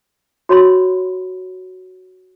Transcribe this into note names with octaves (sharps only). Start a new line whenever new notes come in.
F#4 C#5 B5 C6